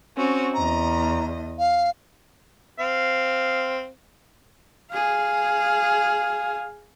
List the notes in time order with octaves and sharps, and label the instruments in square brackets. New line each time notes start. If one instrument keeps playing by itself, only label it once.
[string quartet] C4 C#4 F#4
[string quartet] E2 D#5 [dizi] A#5
[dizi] F5
[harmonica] C4 F5
[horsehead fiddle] G#4 F5